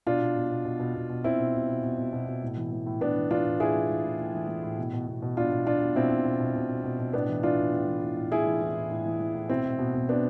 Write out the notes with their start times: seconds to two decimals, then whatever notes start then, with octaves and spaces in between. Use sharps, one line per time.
0.06 B2 D4 F4
0.21 B2
0.36 B2
0.51 B2
0.65 B2
0.80 B2
0.95 B2
1.09 B2
1.24 B2 C4 E4
1.39 B2
1.54 B2
1.69 B2
1.84 B2
1.98 B2
2.13 B2
2.27 B2
2.42 A2
2.57 E3
2.72 E3
2.86 A2
3.01 A2 B3 D4
3.16 E3
3.31 E3 D4 F4
3.46 A2
3.60 A2 E4 G#4
3.75 E3
3.90 E3
4.04 A2
4.19 A2
4.34 E3
4.49 E3
4.63 A2
4.78 B2
4.93 B2
5.08 B2
5.22 B2
5.37 B2 D4 F4
5.52 B2
5.67 B2 D4 F4
5.81 B2
5.96 B2 C4 E4
6.11 B2
6.25 B2
6.40 B2
6.55 B2
6.70 B2
6.84 B2
6.99 B2
7.13 A2 B3 D4
7.29 E3
7.43 E3 D4 F4
7.58 A2
7.73 A2
7.87 E3
8.02 E3
8.17 A2
8.32 A2 E4 G#4
8.47 E3
8.62 E3
8.76 A2
8.91 A2
9.06 E3
9.20 E3
9.35 A2
9.50 B2 C4 E4
9.64 B2
9.79 B2
9.94 B2
10.09 B2 B3 D4